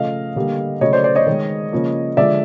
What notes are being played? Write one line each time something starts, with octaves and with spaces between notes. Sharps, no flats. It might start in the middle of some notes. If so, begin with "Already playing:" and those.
Already playing: C#3 F3 A3 D#5 F5
D3 G3 A#3
C#3 F#3 A3 C#5 D#5
C5 D5
C5 D5
C#5 D#5
D#3 G#3
C#3 F3 A#3
D3 F3 G#3 D5 E5